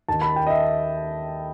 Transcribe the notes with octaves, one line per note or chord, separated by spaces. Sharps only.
D#2 D#3 A5
B5
G5
D#5
E5